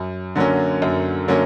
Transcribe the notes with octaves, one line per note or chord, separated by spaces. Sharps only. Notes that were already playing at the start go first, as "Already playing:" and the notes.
Already playing: F#2
D3 F#3 A#3 C#4
F#2
D3 F#3 A#3 C#4